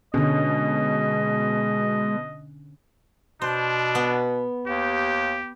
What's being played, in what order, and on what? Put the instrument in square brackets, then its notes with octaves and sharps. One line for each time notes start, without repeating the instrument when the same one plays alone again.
[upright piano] B2 [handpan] D3 C#4 [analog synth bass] G#3 [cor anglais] D#5
[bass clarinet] B2 [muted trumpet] D4 [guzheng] C5
[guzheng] B3
[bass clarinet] D#2 [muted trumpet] G4